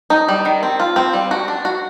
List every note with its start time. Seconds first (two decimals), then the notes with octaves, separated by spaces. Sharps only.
0.10 D#4
0.29 G3
0.45 D#3
0.63 C4
0.80 F4
0.96 C4
1.13 G3
1.31 F#4
1.48 D4
1.65 F#4